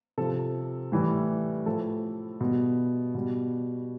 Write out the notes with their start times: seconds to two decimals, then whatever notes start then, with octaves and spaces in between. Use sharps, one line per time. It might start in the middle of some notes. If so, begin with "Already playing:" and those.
0.18 C3 F3 A4
0.92 A2 E3 G3
1.66 A2 F3 A4
2.41 B2 G3
3.15 B2 G3